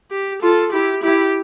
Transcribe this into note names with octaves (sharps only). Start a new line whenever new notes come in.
G4
F4 A4
E4 G4
E4 G4